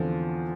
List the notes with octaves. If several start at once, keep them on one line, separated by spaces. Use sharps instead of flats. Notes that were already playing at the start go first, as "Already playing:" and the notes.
Already playing: E2 D3 F3 C4